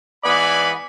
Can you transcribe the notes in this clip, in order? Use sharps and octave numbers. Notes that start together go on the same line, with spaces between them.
G#2 E3 B3 D5 G#5 B5